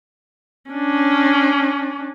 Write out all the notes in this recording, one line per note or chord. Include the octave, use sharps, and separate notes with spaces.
C#4 D4